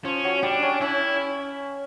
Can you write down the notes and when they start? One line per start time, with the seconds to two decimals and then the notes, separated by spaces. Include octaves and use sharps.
0.05 F3 C#4
0.24 F#3
0.43 G3 D4
0.62 C#4
0.81 C#4 E4